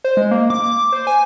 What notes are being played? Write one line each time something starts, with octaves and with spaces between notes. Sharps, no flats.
C5
G#3
A#3
D6
C5
G#5